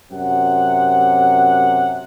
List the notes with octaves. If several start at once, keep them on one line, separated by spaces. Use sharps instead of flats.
F#2 C3 F#5